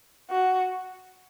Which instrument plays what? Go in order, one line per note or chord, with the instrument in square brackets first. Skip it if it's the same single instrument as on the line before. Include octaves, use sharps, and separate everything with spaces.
[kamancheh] F#4